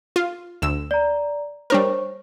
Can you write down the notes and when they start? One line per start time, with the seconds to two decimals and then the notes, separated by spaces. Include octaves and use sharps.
0.16 F4
0.62 D2 E6 E7
0.91 D5 A#5
1.70 G3 D4 A#4 C5 C#5 C#6